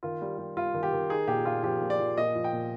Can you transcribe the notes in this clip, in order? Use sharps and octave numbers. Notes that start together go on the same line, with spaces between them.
D#3 F4
G3
G3
G3 F4
D#3
G4
D#3
D#4 G#4
A#2 G4
A#2 F4
F3 G4
A#2
D5
F3
A#2 D#5
F3
G5
A#2